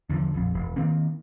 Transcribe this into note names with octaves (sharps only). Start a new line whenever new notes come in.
E2 D3 E3 F3
A#1 F2
E1
D#3 A#3 C4